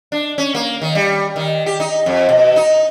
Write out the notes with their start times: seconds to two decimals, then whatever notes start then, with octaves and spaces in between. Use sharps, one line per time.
0.12 D4
0.38 C#4
0.55 A#3
0.82 D#3
0.95 G3
1.36 D#3
1.66 G4
1.80 D#4
2.06 F2
2.29 B2
2.56 D#4